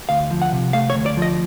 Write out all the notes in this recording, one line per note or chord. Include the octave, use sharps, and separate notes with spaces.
D2 F5
F3
F#5
C3
A3 F5
C#5
D2
D5
F3 D#5